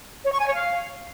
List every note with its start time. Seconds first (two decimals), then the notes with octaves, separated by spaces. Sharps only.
0.24 C#5
0.31 C#6
0.39 G#5
0.46 C#5
0.54 F5